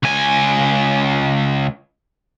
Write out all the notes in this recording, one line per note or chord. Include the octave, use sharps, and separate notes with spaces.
C#2 G#5